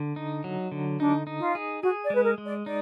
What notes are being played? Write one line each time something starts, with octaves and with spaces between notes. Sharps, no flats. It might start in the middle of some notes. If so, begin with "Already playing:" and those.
Already playing: D3
D#4
F#3
D3
D4 D#4
D#4
F4
G#4
F#4 G#4
D5
G#3 B4
A#4
G#3
D5
D#4 D5